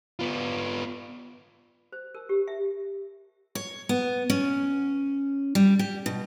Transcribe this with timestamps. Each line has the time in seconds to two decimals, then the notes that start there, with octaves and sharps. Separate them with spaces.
0.19 B3 F4
1.92 C5
2.15 A#4
2.29 G4
2.48 E5
3.55 C#5
3.89 B3
4.30 C#4
5.55 G3
5.79 G4
6.06 B2